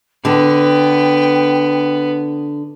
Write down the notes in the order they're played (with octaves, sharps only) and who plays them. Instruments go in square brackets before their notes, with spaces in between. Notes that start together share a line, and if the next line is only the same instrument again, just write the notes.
[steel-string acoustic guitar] D3 [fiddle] B3 [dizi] G5